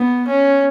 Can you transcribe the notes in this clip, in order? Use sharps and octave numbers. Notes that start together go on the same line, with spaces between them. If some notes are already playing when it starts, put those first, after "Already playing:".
Already playing: B3
C#4